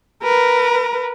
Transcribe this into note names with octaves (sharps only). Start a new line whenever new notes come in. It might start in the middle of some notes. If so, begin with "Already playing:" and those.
A#4 B4